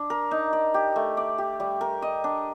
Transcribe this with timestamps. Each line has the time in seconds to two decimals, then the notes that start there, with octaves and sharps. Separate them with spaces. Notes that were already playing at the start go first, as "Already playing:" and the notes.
Already playing: D4
0.10 A#4
0.31 D#4
0.53 D5
0.74 G4
0.96 A3
1.17 D5
1.38 G4
1.60 G3
1.81 A#4
2.02 D#5
2.24 D4